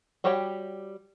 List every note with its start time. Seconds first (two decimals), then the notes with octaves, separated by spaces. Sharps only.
0.24 G3 F#4 G4 C#5 G5